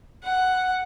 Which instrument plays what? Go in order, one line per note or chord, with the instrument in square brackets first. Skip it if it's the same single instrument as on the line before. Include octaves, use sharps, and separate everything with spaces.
[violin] F#5